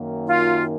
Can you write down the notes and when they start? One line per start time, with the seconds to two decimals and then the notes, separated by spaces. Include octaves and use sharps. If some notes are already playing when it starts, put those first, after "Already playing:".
Already playing: F#2 D#3 A#3
0.27 F4